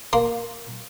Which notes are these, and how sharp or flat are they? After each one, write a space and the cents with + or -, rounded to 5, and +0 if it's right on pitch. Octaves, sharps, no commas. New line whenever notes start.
A#3 +0 C6 +0